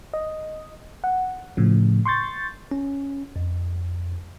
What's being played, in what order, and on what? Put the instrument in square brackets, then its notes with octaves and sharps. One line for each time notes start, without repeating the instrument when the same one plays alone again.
[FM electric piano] D#5
F#5
A2 C#3 F3
C6 C#6 G6 A6
[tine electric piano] C#4
F2